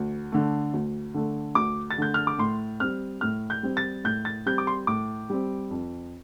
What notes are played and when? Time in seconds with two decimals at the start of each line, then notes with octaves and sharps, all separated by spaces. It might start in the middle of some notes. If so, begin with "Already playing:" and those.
Already playing: D2
0.32 D3 A3
0.73 D2
1.14 D3 A3
1.55 D2 D6
1.91 A6
1.98 D3 A3 G6
2.14 F6
2.27 D6
2.38 A2 C6
2.80 G3 C4 F6
3.21 A2 F6
3.50 G6
3.63 G3 C4
3.77 A6
4.04 A2 G6
4.25 A6
4.46 G3 C4 G6
4.58 D6
4.67 C6
4.87 A2 D6
5.30 G3 C4
5.70 F2